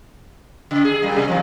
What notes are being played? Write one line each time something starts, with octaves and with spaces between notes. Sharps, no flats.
C#3
G#4
A#2 G3
C3
D#2 A#2 F3